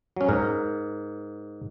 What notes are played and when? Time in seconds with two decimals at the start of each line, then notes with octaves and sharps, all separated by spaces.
0.16 F#3 C#4
0.28 G#2 A#4